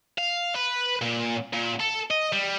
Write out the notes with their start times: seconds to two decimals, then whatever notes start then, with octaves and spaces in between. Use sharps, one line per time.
0.18 F5
0.55 B4
1.01 A#2
1.53 A#2
1.80 A4
2.11 D#5
2.33 G3